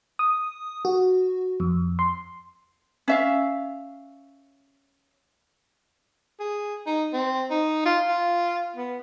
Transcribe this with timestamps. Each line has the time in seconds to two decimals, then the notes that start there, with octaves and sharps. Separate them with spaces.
0.19 D#6
0.85 F#4
1.60 F2
1.99 C6
3.08 C#4 E5 F5
6.39 G#4
6.86 D#4
7.13 C4
7.50 D#4
7.85 F4
8.08 F4
8.76 B3